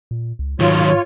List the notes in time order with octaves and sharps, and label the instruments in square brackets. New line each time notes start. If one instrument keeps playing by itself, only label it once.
[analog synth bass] A#2
C#2
[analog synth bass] G#2 [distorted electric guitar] D#3 F#3 [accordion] F4 C#5